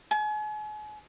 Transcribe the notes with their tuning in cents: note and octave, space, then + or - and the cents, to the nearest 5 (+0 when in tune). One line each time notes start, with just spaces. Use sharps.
G#5 +40